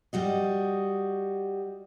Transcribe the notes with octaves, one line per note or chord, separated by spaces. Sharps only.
G3 F#4 D#5